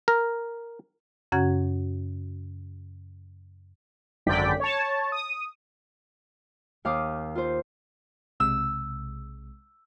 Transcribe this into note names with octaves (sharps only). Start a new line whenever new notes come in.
A#4
F#2 C#3 C#4 F#4 F#5 G#6
G#1 F#2 D3 D5 G5 B6
C#5 A5
D#6
D#2 F5 D6 D#6
F4 C5
B1 C3 G#3 E6